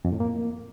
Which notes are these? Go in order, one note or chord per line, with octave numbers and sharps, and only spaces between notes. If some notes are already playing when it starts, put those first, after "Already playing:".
F2
A2
A#3